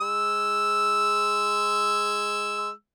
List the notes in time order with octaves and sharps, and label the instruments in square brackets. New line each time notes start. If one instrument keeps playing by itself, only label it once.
[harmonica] G#3 E6